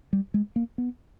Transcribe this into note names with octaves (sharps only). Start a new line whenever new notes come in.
G3
G#3
A#3
B3